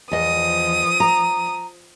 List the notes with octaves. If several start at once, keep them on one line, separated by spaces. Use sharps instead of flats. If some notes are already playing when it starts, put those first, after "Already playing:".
E2 F3 D#5 D#6
A#5